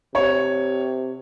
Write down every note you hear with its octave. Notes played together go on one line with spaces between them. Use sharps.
C3 C#5